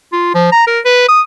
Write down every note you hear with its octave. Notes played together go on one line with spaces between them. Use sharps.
F4
F3
A#5
A#4
B4
D#6